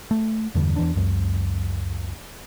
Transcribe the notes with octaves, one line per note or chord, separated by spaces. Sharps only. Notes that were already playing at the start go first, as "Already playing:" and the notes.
A3
E2 G2 D3
E2 E3 D4
C#2 F#2